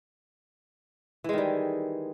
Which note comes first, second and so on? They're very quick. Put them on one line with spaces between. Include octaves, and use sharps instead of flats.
E3 G#3 D#3 G3